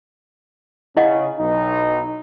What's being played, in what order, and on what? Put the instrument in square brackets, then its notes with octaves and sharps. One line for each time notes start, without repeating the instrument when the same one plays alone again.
[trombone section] C#3 [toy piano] E4 D#5 F#5
[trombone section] B1 D#4